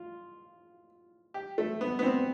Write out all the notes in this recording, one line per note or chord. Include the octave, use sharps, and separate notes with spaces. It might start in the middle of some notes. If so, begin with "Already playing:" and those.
Already playing: F4
G4
A3
B3
B3
C4